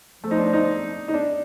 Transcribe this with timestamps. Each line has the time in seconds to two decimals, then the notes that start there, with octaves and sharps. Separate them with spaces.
0.24 F3 A3
0.31 D#4
0.38 D4
0.53 D#4
1.08 D#4
1.14 D4